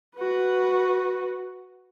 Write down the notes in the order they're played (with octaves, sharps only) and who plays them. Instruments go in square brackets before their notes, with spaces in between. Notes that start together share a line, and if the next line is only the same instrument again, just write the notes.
[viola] F#4 B4